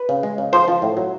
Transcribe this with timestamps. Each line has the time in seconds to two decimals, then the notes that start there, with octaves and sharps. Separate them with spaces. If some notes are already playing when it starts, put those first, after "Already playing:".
Already playing: B4
0.09 C#3
0.23 G#3
0.38 C#3
0.53 F3 C5
0.68 F3
0.82 A2
0.97 F#3